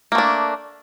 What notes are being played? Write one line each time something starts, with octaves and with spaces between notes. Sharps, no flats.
A3 A#3 D4